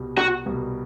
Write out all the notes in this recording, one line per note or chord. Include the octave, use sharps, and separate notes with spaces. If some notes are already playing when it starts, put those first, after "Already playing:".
Already playing: C2 B2 G3
F#4
C2 B2 G3